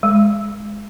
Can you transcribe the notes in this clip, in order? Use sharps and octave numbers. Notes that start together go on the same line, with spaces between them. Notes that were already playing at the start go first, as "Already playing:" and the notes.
G#3